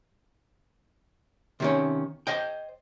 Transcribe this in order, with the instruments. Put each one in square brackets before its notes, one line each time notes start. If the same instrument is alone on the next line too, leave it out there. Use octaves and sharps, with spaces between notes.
[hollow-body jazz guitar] C3 D#3 C#4
C5 D#5 G5